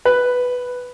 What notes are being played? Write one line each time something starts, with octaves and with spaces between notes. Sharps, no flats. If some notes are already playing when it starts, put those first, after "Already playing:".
B4